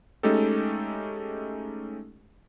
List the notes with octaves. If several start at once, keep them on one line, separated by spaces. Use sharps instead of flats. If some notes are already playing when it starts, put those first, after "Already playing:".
G#3 A3 C#4 D#4 G4 A4